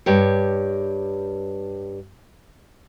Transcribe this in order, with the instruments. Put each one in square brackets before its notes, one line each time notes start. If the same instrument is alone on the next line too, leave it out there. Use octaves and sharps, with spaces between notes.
[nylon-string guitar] G2 G4 C#5